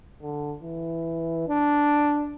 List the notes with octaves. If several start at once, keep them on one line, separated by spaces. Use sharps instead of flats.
D3
E3
D4